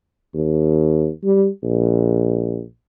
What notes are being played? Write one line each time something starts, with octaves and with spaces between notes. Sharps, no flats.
D#2
G3
A#1